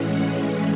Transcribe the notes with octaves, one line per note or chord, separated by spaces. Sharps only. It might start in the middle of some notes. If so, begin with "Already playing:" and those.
Already playing: A2 E3 G#3 C#4 F#5
B4